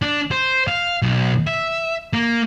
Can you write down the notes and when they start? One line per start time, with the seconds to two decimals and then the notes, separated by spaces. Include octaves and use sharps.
0.02 D4
0.31 C5
0.68 F5
1.02 B1
1.47 E5
2.13 A#3